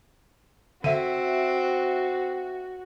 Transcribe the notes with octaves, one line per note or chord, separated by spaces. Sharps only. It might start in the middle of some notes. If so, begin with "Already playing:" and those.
D3 C4 F#4 E5 D#7